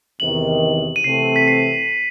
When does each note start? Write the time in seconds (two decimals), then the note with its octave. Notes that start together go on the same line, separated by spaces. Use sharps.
0.20 E2 C3 D#3 F#7
0.96 D#7
1.04 C3 E3 A3 C4 C7
1.36 B6
1.48 C7